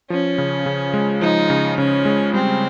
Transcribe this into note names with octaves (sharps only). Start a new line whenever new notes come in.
F3 C#4
C#3
C#3
G#3
F3 D#4
C#3
C#3 C#4
G#3
G3 C4